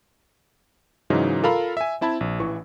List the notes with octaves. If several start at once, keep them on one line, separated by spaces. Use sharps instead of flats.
G#2 C#3 E3 F#3 D#4
F4 A4 A#4 F5 A#5 B5
E5 G#5
C4 E4 A5 B5 G#6
A#1
A1 E3 C#6